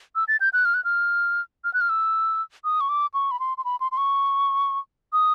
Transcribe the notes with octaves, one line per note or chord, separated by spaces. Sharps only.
E6
A6
G6
F#6
F6
F#6
F6
F6
F#6
F6
E6
D#6
C#6
D6
C#6
B5
C6
C6
B5
C6
C6
C#6
D#6